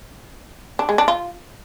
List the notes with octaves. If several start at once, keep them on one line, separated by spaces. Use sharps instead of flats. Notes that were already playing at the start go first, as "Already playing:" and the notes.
D4
G#3
D4
F4